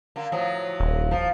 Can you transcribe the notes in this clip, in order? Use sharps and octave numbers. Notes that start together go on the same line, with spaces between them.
D3 A#3
A2 F3 F#3
D#1
F3